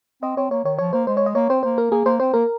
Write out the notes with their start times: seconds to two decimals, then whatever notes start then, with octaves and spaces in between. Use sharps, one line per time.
0.22 C4 D#5
0.37 C4 C#5
0.51 A#3 C#5
0.64 D#3 C#5
0.78 F3 C#5
0.93 A#3 C5
1.07 G#3 C5
1.17 C#5
1.26 D#5
1.35 A#3 C#5
1.49 C4 C5
1.63 A#3 C5
1.78 A#4
1.91 A#3 G#4
2.05 A#3 C5
2.20 C4 C5
2.34 A#3 A#4